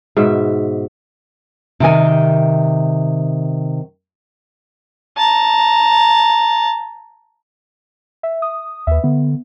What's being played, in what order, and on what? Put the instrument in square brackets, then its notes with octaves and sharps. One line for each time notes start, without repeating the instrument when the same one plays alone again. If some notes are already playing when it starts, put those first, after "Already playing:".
[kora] G#2 B2 E5
[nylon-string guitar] C3 D#3 G#5
[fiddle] A5 A#5
[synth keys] E5
D#6
[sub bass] D#2 [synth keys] B4 E5
[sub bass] D3 [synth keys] B3